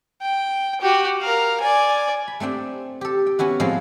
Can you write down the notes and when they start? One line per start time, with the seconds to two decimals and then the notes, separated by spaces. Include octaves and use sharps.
0.21 G5
0.81 F#4 G4
1.21 A#4 F5
1.60 D5 G#5
2.28 B5
2.40 A3 C4 D4 G5
3.01 G4 A4
3.26 G5
3.39 B3 C#4 E4 F#4
3.60 A2 F3 G#3 C4 F4 F5